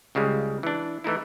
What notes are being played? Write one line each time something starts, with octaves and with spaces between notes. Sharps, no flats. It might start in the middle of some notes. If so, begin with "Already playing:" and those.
C#2 C#3 G3 G#3
E3 D4
E3 A3 D#4 E4